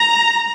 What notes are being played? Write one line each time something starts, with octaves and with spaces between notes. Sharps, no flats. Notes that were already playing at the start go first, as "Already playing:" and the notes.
Already playing: A#5